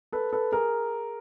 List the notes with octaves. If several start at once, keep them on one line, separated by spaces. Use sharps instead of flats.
A4 B4
A4 B4
G#4 A#4